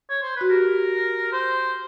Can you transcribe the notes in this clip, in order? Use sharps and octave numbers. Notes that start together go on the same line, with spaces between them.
C#5
C5
F#4 B4
G4 A#4
C5